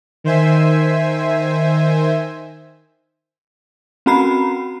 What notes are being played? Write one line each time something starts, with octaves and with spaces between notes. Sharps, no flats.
D#3 C5 E5 G#5
C4 C#4 F#4 A#5 B5 C7